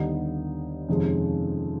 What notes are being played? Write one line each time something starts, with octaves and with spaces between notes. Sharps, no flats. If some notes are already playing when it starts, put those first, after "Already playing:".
Already playing: D#2 D3 G3 B3 D#4
F2 C3 D#3 G#3 C#4